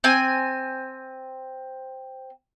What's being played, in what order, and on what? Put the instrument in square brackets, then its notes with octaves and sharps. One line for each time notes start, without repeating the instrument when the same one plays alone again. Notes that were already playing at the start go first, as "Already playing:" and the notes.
[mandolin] C4 G#5